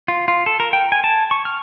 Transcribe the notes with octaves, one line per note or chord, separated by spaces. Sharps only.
F4
F4
A4
A#4
G5
G#5
A5
C#6
F6